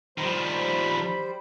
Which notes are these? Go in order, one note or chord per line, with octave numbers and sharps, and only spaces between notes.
D#3 F3 G3 C5 B5